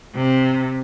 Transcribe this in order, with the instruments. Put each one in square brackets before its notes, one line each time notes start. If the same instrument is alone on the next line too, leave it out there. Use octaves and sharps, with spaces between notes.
[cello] C3